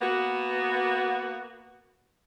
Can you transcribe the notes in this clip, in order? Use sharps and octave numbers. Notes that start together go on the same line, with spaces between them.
A#3 B3 F#4